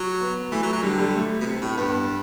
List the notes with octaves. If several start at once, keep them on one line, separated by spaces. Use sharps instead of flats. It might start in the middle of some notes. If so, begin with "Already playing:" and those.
Already playing: F#3
B3
E3 A3
F#3
F#3
D3 G3
G3
A3
B2
C3
A2
G2 B3